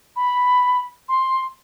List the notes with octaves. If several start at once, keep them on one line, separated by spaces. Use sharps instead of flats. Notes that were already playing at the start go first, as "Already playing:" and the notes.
B5
C6